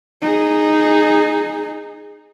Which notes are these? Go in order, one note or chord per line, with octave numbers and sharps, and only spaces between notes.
D#4 G#4